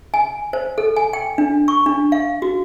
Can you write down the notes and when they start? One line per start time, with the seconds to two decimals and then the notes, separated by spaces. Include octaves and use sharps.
0.14 G#5
0.53 C5
0.78 A4
0.96 G#5
1.13 G5
1.38 D4
1.68 C#6
1.86 D4
2.12 F5
2.42 F#4